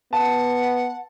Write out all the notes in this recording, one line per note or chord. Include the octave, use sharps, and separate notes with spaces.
B3 F#5 A5